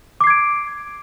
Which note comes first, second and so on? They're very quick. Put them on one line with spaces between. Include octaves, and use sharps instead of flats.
D6 C7 G#6 D7